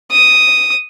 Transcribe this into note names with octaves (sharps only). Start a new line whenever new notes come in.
D#6